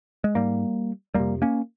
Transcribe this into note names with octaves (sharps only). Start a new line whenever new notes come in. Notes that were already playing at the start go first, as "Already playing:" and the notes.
G#3
G#2 G3 A#3
F2 C3 G3 A#3
A#3 C#4